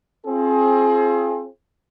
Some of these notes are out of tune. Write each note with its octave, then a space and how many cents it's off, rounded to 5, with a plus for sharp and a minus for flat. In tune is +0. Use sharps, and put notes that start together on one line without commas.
C4 +30 F4 -15 G#4 +30